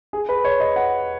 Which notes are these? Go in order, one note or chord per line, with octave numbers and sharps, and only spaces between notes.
G#4
B4
C#5
D#5
F#5